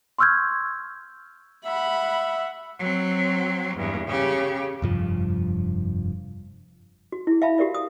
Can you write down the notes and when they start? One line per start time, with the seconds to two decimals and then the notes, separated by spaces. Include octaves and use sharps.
0.19 C6 C#6 E6 F6 G6 G#6
1.65 E5 F#5 B5
2.79 F#3 C4
3.77 E2 G2
4.07 C#3 G4
4.82 F1 G2 F3
7.12 F#4
7.27 E4 G#4
7.42 E5 F5 A5 B5
7.58 F#4 G4 A#4 D5 E5
7.74 D#6